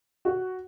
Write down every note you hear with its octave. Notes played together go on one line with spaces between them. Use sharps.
F#4